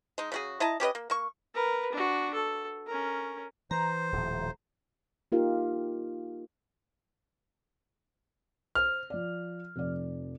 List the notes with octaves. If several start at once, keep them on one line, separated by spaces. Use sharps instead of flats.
G#3 D#4
C#3 F#4 G#4
E4 D#5 A5 A#5
C#4 G4 B4 D#5
A#3
A#3 C#6
A#4 B4
D4 F#4
A4
C#4 A#4
E3 C5 A#5
D#1 A2 F3
A#3 D#4 F4 G4 A#4 F5
C5 F6
F3 D5
F1 F3 D5